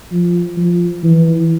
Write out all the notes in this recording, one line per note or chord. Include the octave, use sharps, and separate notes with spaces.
F3
F3
E3